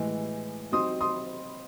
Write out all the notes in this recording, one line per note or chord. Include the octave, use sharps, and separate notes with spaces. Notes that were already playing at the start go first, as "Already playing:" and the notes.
Already playing: A2 E3 G#3
F#3 C4 D#4 C6 D#6
C6 D#6